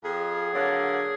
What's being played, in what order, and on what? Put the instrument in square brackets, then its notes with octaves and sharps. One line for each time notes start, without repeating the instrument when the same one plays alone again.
[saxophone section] F2 G#4
D3 F#3 A#3